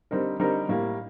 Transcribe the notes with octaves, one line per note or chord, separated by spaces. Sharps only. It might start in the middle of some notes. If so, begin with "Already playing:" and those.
D3 G3 C4 D#4 A#4
D3 G3 C4 D#4 A#4
A2 G3 A#3